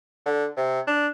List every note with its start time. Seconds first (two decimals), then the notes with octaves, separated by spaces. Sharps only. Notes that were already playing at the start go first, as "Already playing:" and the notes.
0.26 D3
0.57 C3
0.87 D4